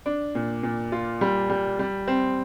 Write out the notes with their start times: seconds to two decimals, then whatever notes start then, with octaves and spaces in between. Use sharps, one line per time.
0.06 D4
0.35 A#2
0.63 A#2
0.92 F4
1.21 G3
1.50 G3
1.79 G3
2.07 C4